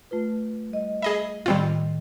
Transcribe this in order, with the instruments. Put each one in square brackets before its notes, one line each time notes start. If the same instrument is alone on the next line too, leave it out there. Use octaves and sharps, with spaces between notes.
[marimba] A3 F4 B4
G3 D#5
[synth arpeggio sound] G#4 D#5 E5 [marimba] B5
[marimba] A2 D#3 [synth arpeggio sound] G3 C4 F4